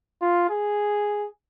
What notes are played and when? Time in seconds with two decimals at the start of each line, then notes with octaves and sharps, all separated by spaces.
0.21 F4
0.50 G#4